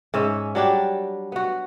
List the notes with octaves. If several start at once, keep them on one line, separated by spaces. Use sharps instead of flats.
G#2 C#4 E5
F#3 G3 D4 G4
B3 F#4